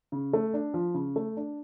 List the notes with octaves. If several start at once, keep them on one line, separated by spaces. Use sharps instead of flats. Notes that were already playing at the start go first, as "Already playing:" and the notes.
C#3
A3
D4
F3
C#3
A3
D4